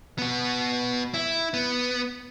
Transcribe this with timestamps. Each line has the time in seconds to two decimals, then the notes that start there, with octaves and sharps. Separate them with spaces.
0.18 B3 F#4
1.14 E4
1.54 B3